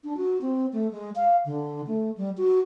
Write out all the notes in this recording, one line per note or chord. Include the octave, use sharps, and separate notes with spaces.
D4
F#4
C4
A3
G#3
F5
D3
A3
G3
F#4